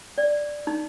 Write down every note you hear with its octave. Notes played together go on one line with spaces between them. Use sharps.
D5
D#4